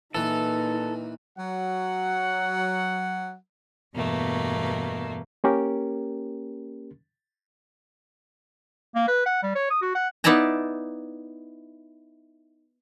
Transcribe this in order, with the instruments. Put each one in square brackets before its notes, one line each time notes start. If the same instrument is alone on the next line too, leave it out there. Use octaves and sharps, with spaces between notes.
[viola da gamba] A#2 [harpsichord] E3 [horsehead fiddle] D#4 [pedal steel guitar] A4
[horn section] F#3 F#5
[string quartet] E2 G2 B2 A3 A#3
[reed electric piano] A#3 C#4 G4 A#4
[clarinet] A#3
B4
F#5
G3
C#5
D#6
F#4
F#5
[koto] B3 D#4 E4 D5 A5 A#5